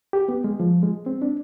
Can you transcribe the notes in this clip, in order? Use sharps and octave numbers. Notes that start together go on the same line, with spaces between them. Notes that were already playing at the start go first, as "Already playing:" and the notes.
G4
B3
G#3
F3
G#3
C4
D4